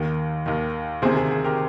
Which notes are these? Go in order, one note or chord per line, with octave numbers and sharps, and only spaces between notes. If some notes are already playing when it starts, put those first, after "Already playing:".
Already playing: D#2 D#3
D#2 D#3
D2 C3 D#3 G#4 C5
G#4
G#4
G4 A#4